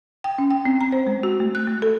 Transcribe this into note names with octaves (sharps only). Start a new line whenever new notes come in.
G5
C#4
G5
C4
A#5
C5
G#3
F#4
A3
F#6
A3
A4